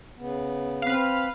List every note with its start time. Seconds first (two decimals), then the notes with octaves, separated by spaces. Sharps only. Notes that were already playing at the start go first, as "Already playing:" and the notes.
0.17 C#3 B3
0.82 C4 B4 F5